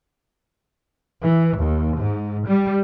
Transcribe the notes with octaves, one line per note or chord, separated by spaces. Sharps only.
E3
D#2
G#2
G3